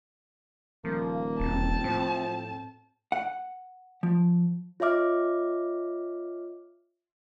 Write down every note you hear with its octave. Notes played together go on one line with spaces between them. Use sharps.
D#1 F3 A#3
E1 C4 A5
A2 F3
F#5
F3
F4 C#5 D#5 E5 D6 F6